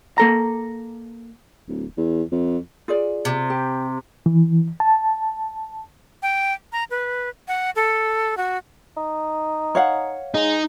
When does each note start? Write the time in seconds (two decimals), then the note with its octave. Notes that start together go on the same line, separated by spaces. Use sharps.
0.18 A#3 A4 A#5
1.68 D1
1.97 E2
2.32 F2
2.88 F4 G#4 D5
3.25 C3
3.50 G4
4.26 E3
4.80 A5
6.22 G5
6.72 A#5
6.91 B4
7.48 F#5
7.76 A4
8.37 F#4
8.97 D#4
9.75 C#5 F5 F#5
10.34 G#3 D#4